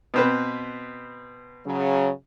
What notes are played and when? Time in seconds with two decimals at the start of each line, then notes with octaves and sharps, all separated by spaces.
0.14 B2 C4 B4
1.66 C#3 F#3